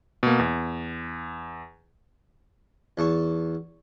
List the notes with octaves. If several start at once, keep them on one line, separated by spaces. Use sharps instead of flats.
B2 A#3
E2
E2 A5 C#6